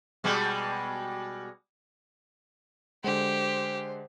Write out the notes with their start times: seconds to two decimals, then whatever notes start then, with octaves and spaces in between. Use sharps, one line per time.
0.24 B2 G3 G#3
3.04 D3 G#3 G4 C5